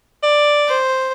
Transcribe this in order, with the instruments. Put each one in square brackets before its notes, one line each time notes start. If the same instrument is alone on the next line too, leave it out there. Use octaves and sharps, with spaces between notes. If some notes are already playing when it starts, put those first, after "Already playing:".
[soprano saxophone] D5
[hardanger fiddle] C5